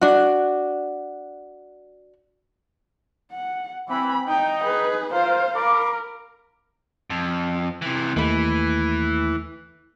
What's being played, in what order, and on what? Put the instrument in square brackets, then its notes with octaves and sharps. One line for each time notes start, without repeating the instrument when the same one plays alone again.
[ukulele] D4 F#4
[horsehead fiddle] F#5
[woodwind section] E3 [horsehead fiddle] C4 B5
[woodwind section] D#4 [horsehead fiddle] G5
[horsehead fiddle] G#4 B4
[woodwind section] F4 A#4 [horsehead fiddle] C5 F5
[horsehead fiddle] A#4 [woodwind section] F5 B5 D6
[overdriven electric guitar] F2
C3 E3
[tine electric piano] D#2 A3 B5 [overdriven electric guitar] E3